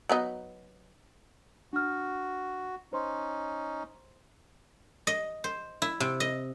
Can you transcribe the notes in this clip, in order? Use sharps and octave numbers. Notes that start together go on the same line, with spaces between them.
F#3 B3 D#4
D4 F#4 F6
C#4 D#4 C5 C6
D#5
C5
E4
C3
D#5